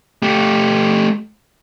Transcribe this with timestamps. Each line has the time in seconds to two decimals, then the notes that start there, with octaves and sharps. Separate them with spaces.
0.22 A3 G4